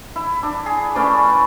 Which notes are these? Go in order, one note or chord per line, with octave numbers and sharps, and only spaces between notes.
E4
D4
G#4
A3 C#4 B4 D5